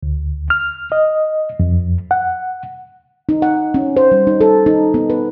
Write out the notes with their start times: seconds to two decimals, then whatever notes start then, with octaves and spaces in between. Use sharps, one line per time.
0.03 D2
0.50 F6
0.92 D#5
1.60 F2
2.11 F#5
3.29 D#4
3.42 F#5
3.74 C#4
3.97 C5
4.12 G3
4.27 D#4
4.41 A4
4.66 D#4
4.94 B3
5.10 B4